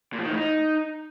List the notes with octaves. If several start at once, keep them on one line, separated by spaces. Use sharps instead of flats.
A#2
F3
D#3
A2
D#4